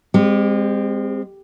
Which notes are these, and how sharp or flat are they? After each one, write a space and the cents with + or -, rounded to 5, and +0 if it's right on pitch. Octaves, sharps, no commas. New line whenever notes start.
G#3 -35 C4 -5 G4 +0